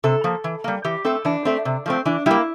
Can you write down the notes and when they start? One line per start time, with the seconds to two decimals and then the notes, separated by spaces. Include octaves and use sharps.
0.04 C3 A4
0.24 F3 A#3
0.44 E3
0.64 G3 A#3
0.84 E3 G4
1.05 A3 C4 A4
1.25 E3 D4
1.45 A3 C4
1.65 C3
1.86 F3 A3 C4
2.06 E3 D4
2.26 G3 A#3 E4